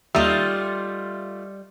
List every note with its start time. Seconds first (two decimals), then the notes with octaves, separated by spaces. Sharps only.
0.15 D#2 G3 A3 D#4 F4 D#5 E5